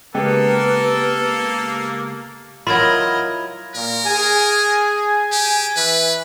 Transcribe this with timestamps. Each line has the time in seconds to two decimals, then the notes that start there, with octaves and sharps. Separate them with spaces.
0.15 C#3 G#3 A#3 B3 G4 A4
2.67 F#3 E4 F4 A#4 D#5 E5 B5 G#6
3.75 A#2 A#4
4.05 G#4 G#5
5.32 G4
5.77 E3 B4